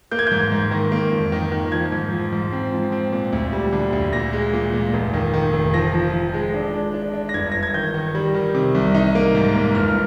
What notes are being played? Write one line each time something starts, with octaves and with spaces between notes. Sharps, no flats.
A#3 G6
G#6
G#2 G6
G#2
D#3
A#3
F2
D#3
D#3
F3 G#6
G#2
F3
G#2
C4
F3
C4
A#2
D2
G3
D3
D2
A#2 A#6
G#3
A#2
A#2
F1
D#3
D#3
F1
F3 A#6
F3
F3
G#3
D4
D4
D4
D4
A#6
G1 G#6
G1 A#6
G#6
D#3 G6
D#3
G3
D#3
C3
C2
D#4
A#3
G#2
A#3
G1 F6